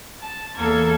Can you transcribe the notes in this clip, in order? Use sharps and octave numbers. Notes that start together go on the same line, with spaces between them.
A5
E2 A#3 A4 G#6